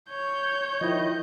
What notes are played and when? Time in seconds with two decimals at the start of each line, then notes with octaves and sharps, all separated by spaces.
0.10 C#5 G6
0.81 D#3 F3 E4 D#5